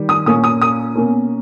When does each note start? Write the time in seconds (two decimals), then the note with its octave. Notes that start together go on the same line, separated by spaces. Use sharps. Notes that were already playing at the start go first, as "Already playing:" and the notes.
Already playing: D#3 G3
0.09 D#6
0.26 A#2 A#3 C#4 D#6
0.44 D#6
0.62 D#6
0.96 B2 A#3 C#4